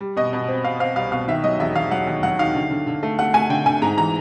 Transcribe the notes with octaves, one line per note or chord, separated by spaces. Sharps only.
G3
B2 D#5
B2
C4
C4 F5
C4 F5
C2 F5
B2 F5
D#3 E5
F#3 D#5
E1 E5
E1 F5
F#3 F#5
D#2
F#3 F#5
D#3 F5
D3
D3
D3
A3
A3 F#5
A3 G#5
D3 G5
D3 G#5
G#2 A#5
E3 A#5